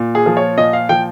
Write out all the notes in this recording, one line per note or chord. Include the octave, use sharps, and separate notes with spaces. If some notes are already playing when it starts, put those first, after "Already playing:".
Already playing: A#2
G#4
F3
C#5
A#2 D#5
F5
F3 G5